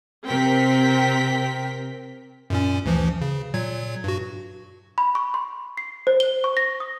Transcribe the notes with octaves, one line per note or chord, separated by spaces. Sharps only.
C3 C4 A#4 G5 B6
F#2 A#2 C#4
D2 E3 F3
C#3
A#2 F#3 G#6
G2 F#4
B5
C#6
C6
C7
C5
G7
C#6
A#6
D#6